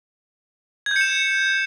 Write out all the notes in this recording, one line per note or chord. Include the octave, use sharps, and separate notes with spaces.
G6 G#6 C#7 E7